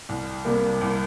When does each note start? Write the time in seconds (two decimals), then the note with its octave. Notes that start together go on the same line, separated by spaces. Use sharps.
0.09 C2
0.45 C3 G3 A#3
0.81 C2